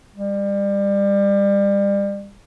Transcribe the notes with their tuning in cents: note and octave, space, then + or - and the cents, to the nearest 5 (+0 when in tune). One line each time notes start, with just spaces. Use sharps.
G3 +30